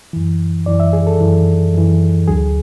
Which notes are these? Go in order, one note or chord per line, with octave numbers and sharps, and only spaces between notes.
F#2 E3
F#2 E3 D5
E5
G#4
A4
F#2 E3
F#2 E3
D2 D3 F#3 G#4